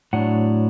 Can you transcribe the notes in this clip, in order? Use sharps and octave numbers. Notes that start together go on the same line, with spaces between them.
A2 F#3 D4 F#5